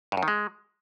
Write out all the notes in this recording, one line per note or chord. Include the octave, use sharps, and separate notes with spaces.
G2
F#2
D#3
G#3